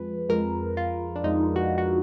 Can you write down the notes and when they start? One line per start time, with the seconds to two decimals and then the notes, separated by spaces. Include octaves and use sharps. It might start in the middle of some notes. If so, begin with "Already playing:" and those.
Already playing: F2 F3 G#3 B4
0.29 F2 F3 G#3 A#4
0.77 F4
1.16 D4
1.24 F2 F3 G#3 D#4
1.56 F#4
1.78 F#4